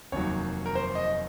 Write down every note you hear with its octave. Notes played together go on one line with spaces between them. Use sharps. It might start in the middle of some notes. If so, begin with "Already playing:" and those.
F1 D#2 D#3 F#3 C#5
A#4
C5
D#5